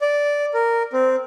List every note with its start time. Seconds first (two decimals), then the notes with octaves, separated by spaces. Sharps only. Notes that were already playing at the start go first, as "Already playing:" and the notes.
0.02 D5
0.54 A#4
0.93 C4